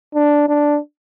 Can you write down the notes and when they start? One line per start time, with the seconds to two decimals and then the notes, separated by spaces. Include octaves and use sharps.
0.15 D4
0.49 D4